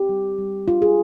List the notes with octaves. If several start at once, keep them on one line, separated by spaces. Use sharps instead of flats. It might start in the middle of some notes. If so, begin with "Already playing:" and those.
Already playing: C4 G4
G3
G3
D4 F4
G#4